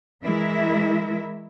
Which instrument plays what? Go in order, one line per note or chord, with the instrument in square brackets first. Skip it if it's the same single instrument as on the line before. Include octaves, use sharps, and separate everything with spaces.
[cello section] E3 G#3 E4 A#4 E5